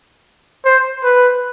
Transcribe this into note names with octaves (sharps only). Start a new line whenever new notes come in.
C5
B4